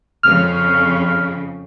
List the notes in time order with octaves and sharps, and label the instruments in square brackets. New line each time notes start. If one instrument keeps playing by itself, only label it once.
[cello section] F2 C#3 [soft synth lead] F6